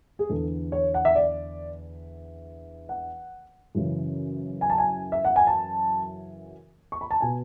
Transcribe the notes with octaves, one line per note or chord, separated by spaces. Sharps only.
G#4
E2 D3 A4
C#5
F#5
E5
D5
F#5
F#2 C#3 E3
G#5
A5
G#5
E5
F#5
G#5
A5
C#6
B5
A5
B2 G#5